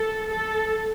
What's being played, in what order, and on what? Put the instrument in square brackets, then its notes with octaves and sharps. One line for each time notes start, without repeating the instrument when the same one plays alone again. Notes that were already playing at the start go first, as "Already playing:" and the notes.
Already playing: [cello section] A4
A4